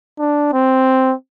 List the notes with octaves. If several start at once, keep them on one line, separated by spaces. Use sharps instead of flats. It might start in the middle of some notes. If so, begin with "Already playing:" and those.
D4
C4